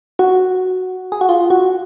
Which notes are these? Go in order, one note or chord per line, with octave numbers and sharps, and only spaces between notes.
F#4
G#4
F#4
F4
F#4